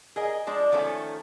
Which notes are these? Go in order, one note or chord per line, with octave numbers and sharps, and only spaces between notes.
G#4 A#4 D#5
F3 G#3 D4
D#3 F3 A3 C#4 A4